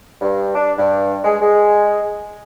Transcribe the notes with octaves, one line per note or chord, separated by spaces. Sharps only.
G2
D4
G2
G#3
G#3